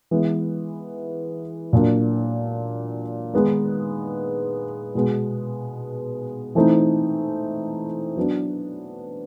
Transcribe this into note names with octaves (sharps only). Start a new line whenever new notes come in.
E3 G#3 B3 E4
A#2 F#3 A#3 D4
D#3 G#3 B3 D#4
B2 G#3 B3
E3 A3 C4 D#4
F#3 B3 D4